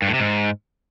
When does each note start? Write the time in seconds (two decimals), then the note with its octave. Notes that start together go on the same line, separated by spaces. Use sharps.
0.02 G2
0.08 A2
0.14 C3
0.20 G#2